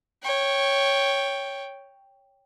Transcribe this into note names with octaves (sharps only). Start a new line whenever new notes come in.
C#5 G5